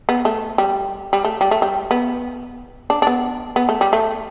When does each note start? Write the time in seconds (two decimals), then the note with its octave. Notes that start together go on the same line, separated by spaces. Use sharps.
0.09 B3
0.25 A3
0.58 G3
1.13 G3
1.25 A3
1.41 G3
1.51 A3
1.62 G3
1.91 B3
2.90 D4
3.02 D4
3.07 B3
3.56 B3
3.69 A3
3.81 G3
3.93 A3